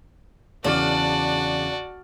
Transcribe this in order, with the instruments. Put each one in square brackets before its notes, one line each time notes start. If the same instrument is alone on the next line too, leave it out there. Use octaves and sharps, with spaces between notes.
[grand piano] E2 C#3 F6 [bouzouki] D4 [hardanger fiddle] F#4 D5